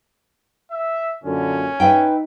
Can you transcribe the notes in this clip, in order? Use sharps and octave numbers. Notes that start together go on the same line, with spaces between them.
E5
F#2 A#2 D3 C#4
D#4 B4 E5 G5